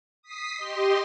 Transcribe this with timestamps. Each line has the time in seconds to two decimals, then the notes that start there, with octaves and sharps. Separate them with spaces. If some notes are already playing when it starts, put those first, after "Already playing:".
0.22 D#6 B6 C7
0.56 G4 D#5 C6